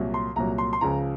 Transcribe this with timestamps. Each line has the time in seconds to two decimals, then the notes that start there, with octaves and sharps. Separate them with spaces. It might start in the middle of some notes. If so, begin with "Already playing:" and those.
Already playing: C2 A#2 F#3
0.14 C6
0.36 C2 A#2 F#3 A#5
0.58 C6
0.73 C6
0.81 C#2 C#3 F3 A#5